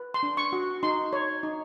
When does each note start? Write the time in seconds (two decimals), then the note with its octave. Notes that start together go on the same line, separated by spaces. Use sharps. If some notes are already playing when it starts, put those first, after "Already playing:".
Already playing: B4
0.14 C6
0.23 D4
0.37 C#6
0.53 F#4
0.83 D#4 C6
1.13 C#5
1.43 D#4